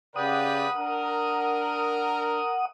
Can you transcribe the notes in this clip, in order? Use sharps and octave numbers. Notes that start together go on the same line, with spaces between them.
C#3 G4 B4 D5 F#5 G5 D#6
D4 A#4